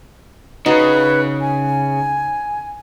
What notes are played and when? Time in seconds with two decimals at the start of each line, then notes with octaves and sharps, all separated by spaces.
0.66 C#3 D#4 F#4 B4
1.41 G#5